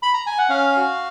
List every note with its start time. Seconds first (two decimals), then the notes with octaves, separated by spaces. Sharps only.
0.03 B5
0.14 A#5
0.27 G#5
0.38 F#5
0.49 C#4 F5
0.77 F#4